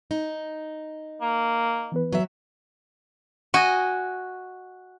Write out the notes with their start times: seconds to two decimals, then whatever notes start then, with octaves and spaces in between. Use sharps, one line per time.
0.11 D#4
1.21 A#3
1.92 E3 B3 B4
2.13 F#3 E5
3.54 F#4 D#5 G#5